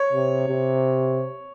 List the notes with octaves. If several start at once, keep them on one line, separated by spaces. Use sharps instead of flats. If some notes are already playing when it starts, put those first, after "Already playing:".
Already playing: C#5
C3
C3